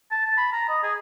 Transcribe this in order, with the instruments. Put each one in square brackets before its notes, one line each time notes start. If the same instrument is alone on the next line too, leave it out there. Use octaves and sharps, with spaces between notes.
[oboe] A5
A5
B5
A#5
D#5
G#4